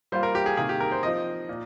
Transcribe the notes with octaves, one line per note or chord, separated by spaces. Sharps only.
G3 A#3 F4 C5
A#4
G4
G#4
C3 D#3 A#3 G#4
G4
A#4
C5
F3 C4 D#4 D#5
A#2